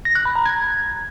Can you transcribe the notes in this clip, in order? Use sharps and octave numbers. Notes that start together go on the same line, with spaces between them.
A#6
F#6
B5
A#5
G#6